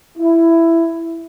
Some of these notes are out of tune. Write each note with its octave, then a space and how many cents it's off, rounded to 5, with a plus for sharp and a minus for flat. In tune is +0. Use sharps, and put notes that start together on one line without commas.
E4 +10